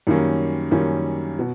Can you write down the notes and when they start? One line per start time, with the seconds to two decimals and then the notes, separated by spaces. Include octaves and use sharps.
0.07 F#2 D#3 G3 A#3 C#4
0.71 F#2 D#3 G3 A#3 C#4
1.39 B2